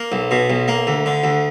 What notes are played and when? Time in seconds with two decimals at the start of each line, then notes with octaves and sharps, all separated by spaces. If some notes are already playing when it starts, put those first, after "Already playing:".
Already playing: A#3
0.12 B1
0.31 B2
0.50 B1
0.68 A#3
0.87 D2
1.06 D3
1.24 D2